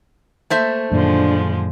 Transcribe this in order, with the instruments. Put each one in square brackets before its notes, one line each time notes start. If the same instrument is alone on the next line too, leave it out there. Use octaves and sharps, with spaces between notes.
[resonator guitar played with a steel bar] A3 C5 E5 [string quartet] A#3
[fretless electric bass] F#2 A#2 D#3 [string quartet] D3 F3 G#3 [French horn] D4